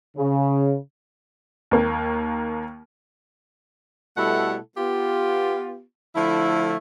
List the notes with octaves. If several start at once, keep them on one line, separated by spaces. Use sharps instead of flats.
C#3
D#2 A#3
B2 G3 A3 E4 A4 F#5
B3 F4 G4
D3 F3 A3 E4